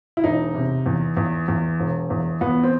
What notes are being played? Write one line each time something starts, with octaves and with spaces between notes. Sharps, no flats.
E4
E1 D#4
C3
E2
E2
E2
E1
E2
E2 B3
C4